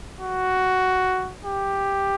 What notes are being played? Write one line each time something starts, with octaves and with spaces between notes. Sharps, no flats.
F#4
G4